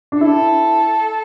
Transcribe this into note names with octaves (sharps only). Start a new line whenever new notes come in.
D4
E4 A4